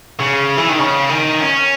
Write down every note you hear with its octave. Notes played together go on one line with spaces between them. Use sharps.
C#3
E3
D#3
C#3
D#3
C#4